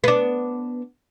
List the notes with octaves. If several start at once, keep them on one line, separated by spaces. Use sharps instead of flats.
B3 D4